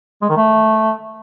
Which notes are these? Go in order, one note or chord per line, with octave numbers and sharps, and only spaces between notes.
G#3
D#3
A3